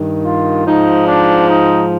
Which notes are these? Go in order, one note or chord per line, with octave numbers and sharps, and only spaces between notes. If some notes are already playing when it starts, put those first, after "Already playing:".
Already playing: G2 D#3
F4
G#2 F3 D#4
D4
D#4